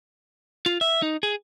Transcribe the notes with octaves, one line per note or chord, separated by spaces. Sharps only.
F4
E5
D#4
G#4